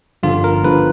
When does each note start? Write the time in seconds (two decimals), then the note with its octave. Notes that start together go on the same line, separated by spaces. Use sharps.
0.23 G1 G2 D3 F3 F4
0.44 A#4
0.64 G1 G2 D3 F3 B4